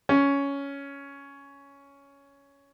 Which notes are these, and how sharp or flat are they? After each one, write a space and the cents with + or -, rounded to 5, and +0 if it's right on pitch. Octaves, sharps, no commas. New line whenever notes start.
C#4 +10